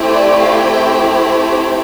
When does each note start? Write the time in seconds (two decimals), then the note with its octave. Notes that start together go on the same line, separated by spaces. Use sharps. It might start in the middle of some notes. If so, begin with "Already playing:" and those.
Already playing: A3 C4 E4 G4
0.12 D5
0.40 F5
0.69 G5